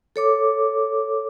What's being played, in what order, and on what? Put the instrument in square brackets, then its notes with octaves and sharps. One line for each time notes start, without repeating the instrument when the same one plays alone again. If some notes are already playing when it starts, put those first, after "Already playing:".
[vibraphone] A4 C#5 D6